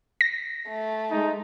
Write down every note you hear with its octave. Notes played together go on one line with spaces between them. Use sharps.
A#6
A3
G#3 D#4